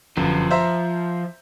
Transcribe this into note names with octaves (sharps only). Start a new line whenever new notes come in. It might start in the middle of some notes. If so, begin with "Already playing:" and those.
G1 F#2 F3
C5 E5 A#5